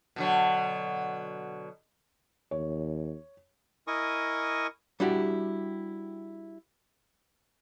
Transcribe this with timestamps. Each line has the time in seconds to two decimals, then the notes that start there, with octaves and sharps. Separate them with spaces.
0.16 B2 D3 F#3
2.51 D#2 C#5
3.87 E4 A#4 D#5 G#5 C#6 D#6
5.00 G3 D4 E4 F#4 G4